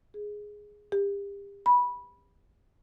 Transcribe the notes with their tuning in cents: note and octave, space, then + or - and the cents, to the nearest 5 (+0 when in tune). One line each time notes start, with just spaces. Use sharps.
G#4 +0
G4 +35
B5 -15